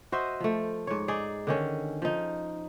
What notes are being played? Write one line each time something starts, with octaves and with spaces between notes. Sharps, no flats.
F#4 C5 D#5 E5
F3 A3
G#2 C#5
D#4 G#4 D5
D3 D#3 C#4
F3 D#4